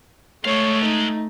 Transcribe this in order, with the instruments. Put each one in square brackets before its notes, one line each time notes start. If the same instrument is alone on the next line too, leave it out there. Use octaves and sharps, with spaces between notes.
[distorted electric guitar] G#3 F5 [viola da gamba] A3 [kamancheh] C#5
[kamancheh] D#4